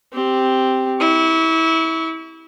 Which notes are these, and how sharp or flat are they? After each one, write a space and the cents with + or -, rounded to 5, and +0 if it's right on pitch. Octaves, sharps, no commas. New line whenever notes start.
C4 +0 G4 +0
E4 -25 C#6 +30